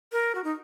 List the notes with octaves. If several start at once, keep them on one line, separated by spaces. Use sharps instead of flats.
A#4
F#4
D#4